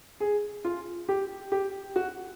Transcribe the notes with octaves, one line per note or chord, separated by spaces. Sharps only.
G#4
F4
G4
G4
F#4